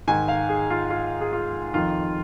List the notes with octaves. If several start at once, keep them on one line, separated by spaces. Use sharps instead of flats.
G#2 D#3 G#5
F5
G#4
F4
F4
G#4
F4
F2 D#3 F4